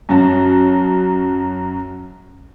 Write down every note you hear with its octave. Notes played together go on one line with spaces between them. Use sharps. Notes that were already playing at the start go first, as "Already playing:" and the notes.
F#2 F#3 F#4 A5